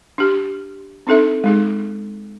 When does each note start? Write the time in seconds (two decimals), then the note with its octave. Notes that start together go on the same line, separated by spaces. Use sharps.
0.18 D4 G4
1.07 C4 D4 D#4 A4 E5
1.44 G#3 D#4 G#4